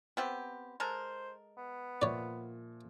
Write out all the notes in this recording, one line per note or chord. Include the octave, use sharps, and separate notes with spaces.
B3 C4 G4
G#3 A4 A#4 C5
B3
A#2 F3 C#5 D5 E5